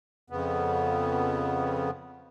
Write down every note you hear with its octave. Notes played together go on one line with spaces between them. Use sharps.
F2 C#3 B3